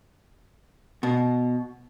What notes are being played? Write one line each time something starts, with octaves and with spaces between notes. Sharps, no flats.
B2